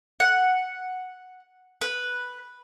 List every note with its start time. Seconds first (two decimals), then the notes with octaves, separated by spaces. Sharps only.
0.20 F#5
1.81 B4